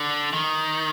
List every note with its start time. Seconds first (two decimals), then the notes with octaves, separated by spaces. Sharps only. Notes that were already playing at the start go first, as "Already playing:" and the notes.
Already playing: D3
0.33 D#3